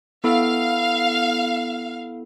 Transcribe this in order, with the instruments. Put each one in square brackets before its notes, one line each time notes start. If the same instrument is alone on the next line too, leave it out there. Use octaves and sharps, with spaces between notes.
[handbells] B3 E4 A4 [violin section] F5